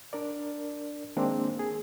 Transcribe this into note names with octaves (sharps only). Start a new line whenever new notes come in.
D4 A#4 D5
D#3 G#3 A#3 C4 D4
G#4